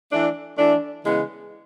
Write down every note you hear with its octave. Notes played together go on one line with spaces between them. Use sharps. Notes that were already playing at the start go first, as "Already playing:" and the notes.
E3 A3 D4
E3 A3 D4
C#3 E3 G#3 B3 E4